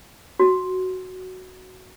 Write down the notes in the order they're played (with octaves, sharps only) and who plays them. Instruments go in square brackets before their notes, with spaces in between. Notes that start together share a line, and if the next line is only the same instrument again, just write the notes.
[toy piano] F#4